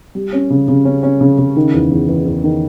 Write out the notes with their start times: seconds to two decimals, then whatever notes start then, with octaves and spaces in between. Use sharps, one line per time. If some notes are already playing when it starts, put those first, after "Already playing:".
0.15 G3
0.33 C#4
0.50 C#3
0.68 C#3
0.85 C#4
1.03 C#4
1.21 C#3
1.38 C#3
1.56 D#3
1.74 E2
1.91 E2
2.09 E2
2.26 E2
2.44 D#3